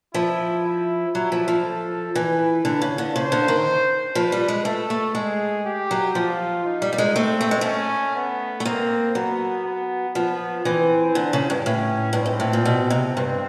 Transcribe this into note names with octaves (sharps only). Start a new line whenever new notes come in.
F3 E4
E4
F#3 E4
F3
F3
A4
E3 B4
D3
C#3
D3
C#3 C5
D3
D#3
F3 B4
G3
G#3
A3 A4
A3
G#3 G#4
G4
F#3
F3 F4
D#4
G3
G3
G#3
A3 C4
A3
G#3
A3 C#4
B3
A3
A#3 C4
F#3 B3
B3
F3 B3
E3 C4
D3
C#3
G2
A2 C#4
G2 C4
G#2
A2
A#2
B2
C3
G2 C4